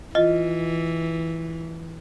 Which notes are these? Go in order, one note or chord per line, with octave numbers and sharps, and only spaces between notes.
E3 F4 D#5